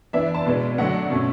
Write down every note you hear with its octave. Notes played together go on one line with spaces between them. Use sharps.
E3 B3 D4 E5
A5
B2 G#3 B3 D4
D3 F#3 A3 D4 F#5
B2 A3 C#4